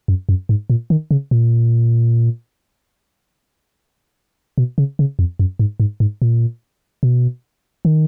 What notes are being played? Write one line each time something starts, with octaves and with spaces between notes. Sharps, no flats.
F#2
F#2
G#2
A#2
D#3
C#3
A#2
B2
C#3
C#3
F2
F#2
G#2
G#2
G#2
A#2
B2
D#3